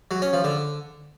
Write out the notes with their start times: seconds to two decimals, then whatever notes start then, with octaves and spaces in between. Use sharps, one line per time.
0.11 F#3
0.22 C#4
0.33 F3
0.44 D3